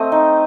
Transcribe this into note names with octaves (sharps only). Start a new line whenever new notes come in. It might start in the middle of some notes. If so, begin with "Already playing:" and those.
Already playing: A3 C4 D#5
D#4